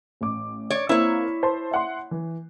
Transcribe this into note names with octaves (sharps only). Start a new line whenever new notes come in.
A1 D6
C#5 D5
A#3 C4 E4 C#5
C5 A5 C6
E5 F#5 C6
E3